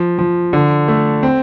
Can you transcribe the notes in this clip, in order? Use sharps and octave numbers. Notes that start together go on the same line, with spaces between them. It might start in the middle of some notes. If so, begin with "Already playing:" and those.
Already playing: F3
F3
D3
A3
C4